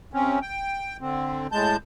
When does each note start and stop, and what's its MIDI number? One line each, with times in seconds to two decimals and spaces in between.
0.14 0.39 48
0.14 0.39 60
0.14 0.39 61
0.42 0.97 79
1.01 1.47 50
1.01 1.47 60
1.52 1.77 45
1.52 1.77 56
1.52 1.77 81
1.52 1.77 91